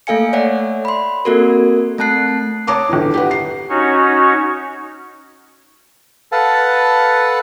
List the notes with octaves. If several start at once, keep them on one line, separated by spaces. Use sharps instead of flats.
A3 A#3 A4 F5 G#5 C#7
C#5 D5 E5 F#5
B5 C6
A#3 C4 F#4 A4 A#4
A3 C4 A5 F#6 C7
C#5 A5 A#5 D6 D#6
G1 E2
G4 B4 F#5
C7
C#4 D#4 F#4 C#5
A4 B4 F5 F#5 A5